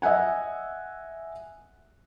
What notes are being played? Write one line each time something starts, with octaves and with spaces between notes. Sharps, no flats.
D#5 E5 F#5 G#5